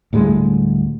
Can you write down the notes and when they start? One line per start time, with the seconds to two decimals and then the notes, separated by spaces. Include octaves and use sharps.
0.13 D2 A2 G3 G#3